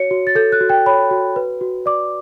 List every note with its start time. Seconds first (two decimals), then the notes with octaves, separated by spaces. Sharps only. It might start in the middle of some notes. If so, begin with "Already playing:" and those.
Already playing: F#4 C#5 C#7
0.11 F#4
0.27 A6
0.35 A4 G6
0.52 F#6
0.61 F#4
0.70 G5
0.86 C#5 B5
1.11 F#4
1.36 B4
1.61 F#4
1.86 D5 D6